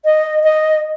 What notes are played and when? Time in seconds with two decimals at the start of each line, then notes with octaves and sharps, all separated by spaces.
0.05 D#5
0.44 D#5